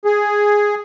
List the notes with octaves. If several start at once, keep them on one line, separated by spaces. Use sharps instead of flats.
G#4